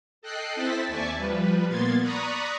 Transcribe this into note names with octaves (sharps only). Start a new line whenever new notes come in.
A4 D#5 G5 F#6 C7
C4 E4 A4 C5 A6 B6
D#2 D5 E5 G#5 A5 C#6
F3 G3 B4
A#2 A#3 B3 C6 G#6 A6
D5 A#5 B5 C#6 D#6 F#6